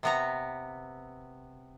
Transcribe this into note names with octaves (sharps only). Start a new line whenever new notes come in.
C3 B3 A#5